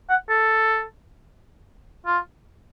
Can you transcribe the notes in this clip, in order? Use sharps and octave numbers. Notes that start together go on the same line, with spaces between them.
F#5
A4
F4